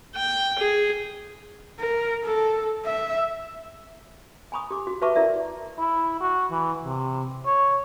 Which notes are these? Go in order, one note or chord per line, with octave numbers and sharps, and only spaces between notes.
G5
G#4
A#4
A4
E5
G#5 A#5 B5 C#6 D#6
G4 D6
F#4
F#4 B4 E5 A5 C#6 D6
E4 A#4 D5 E5 A5
E4
F#4
E3
C3
C#5